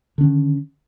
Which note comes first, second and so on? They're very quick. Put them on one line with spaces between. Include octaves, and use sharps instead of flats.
D3 C#4 D#3